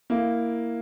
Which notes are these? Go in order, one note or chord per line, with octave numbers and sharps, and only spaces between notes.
A#3 E4